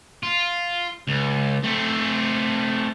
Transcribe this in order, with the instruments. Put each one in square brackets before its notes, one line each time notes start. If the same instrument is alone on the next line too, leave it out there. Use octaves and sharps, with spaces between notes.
[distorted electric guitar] F4
C#2
A3 C4